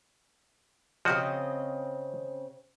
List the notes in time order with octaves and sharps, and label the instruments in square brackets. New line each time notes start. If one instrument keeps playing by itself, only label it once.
[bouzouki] C#3 C4 D#5 [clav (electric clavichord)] F3 F#4